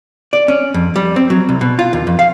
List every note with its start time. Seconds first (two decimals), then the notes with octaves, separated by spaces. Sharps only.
0.33 D5
0.48 C#4
0.74 F2
0.96 G3
1.16 C4
1.30 F#3
1.49 C2
1.61 B2
1.79 F4
1.93 D#2
2.07 F2
2.19 F5